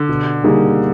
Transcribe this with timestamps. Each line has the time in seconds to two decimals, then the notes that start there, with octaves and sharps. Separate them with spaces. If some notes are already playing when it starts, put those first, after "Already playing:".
Already playing: D3
0.09 B2
0.44 G3 A#3 D#4 G#4